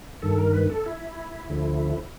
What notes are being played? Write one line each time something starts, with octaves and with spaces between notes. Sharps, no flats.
G2 D#3 A4
A#4
B4
A4
E4
D2 D3 F3